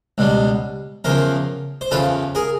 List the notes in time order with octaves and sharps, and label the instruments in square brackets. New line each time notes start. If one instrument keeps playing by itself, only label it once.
[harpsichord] C#2 B2 G3
E2 C#3 F3 A#4 C5
C5
E2 C#3 F3 A4 B4
G#4 A#4